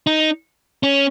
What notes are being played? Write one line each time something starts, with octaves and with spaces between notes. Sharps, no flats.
D#4
C#4